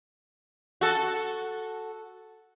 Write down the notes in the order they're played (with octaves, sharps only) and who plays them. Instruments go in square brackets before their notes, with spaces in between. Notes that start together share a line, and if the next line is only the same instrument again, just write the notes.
[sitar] F#4 A4